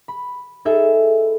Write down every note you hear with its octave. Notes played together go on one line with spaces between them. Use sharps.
B5
D#4 G#4 A4 E5